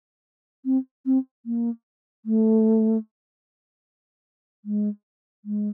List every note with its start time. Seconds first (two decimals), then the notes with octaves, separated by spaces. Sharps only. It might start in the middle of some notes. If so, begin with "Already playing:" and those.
0.65 C4
1.06 C4
1.46 A#3
2.25 A3
4.65 G#3
5.45 G#3